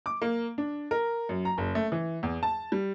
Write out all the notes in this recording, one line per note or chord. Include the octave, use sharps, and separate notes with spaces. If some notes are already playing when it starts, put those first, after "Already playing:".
D6
A#3
D4
A#4
F#2
A#5
F#1
A3
E3
E2
A5
G3